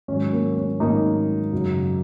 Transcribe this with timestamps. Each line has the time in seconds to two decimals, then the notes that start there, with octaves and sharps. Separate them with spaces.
0.08 G#2 D#3 F#3 C#4
0.32 A#3
0.56 C#4
0.80 G#2 D#3 F#3 A#3 D#4
1.52 F#2 C#3 F#3